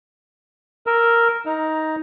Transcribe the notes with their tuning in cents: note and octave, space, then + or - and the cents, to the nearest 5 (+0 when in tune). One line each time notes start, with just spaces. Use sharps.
A#4 +0 E6 +0
D#4 +15 A#5 +0